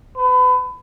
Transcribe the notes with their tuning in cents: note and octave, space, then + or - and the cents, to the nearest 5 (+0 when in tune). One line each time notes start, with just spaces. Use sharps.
B4 +30